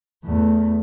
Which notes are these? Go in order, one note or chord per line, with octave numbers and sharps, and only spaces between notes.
E2 A3